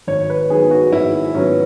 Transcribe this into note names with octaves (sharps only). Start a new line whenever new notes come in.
G#1 C#5
B4
G#2 D#3 F#3 B3 G#4
F#4
G#1 E4
G#2 D#3 F#3 B3 C#4